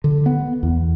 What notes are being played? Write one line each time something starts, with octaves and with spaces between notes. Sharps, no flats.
D3
B3
E2